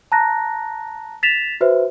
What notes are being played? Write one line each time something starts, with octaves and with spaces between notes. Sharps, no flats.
A5 A#5 F#6 A#6
A6 B6 E7 F7
F#4 B4 C5 E5